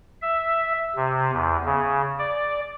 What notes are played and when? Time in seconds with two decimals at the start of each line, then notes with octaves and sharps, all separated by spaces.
0.22 E5
0.96 C3
1.32 E2
1.65 C#3
2.19 D5